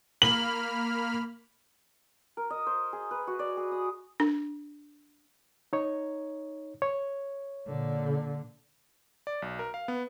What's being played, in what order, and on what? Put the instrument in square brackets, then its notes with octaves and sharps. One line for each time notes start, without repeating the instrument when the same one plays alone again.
[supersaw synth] A#3 B5 F6 [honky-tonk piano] F#7
[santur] A#4
D#5
C5
G#4
B4
F#4
D5
G#4
D#6
[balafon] D4
[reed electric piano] D#4 C#5
C#5
[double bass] A#2 D3
[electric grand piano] D5
B1
A#4
F5
B3